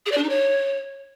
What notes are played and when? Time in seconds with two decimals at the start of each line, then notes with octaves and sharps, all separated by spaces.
0.06 G#4
0.11 D5
0.17 D4
0.23 D#4
0.29 C#5